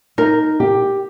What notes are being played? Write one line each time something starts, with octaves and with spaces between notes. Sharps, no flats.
D#4 A#4
G4